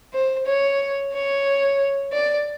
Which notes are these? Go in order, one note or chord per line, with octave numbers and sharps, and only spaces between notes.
C5
C#5
C#5
D5